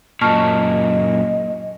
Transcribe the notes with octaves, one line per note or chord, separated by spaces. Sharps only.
F#2 A#2 D#5 A5 C#6 F6